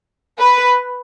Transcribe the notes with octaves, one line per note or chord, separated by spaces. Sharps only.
B4